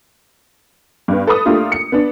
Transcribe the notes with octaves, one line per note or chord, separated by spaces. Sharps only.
G2 B3
A4 B4 B5 D#6
A3 A#3 D4 F4 G4
C#7
B3 D4